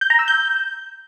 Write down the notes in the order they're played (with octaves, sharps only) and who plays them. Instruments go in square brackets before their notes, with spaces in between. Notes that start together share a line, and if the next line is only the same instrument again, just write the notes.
[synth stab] G6
A#5
E6
G6